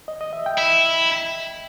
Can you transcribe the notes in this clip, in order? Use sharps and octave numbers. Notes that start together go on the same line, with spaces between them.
D#5
D#5
E5
G5
E4 E5